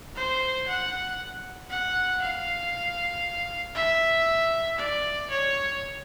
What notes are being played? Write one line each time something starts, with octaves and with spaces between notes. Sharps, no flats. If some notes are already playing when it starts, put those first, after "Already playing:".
C5
F#5
F#5
F5
E5
D5
C#5